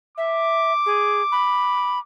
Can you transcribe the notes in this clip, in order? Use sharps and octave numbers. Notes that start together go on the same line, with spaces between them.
E5 D6
G#4
B5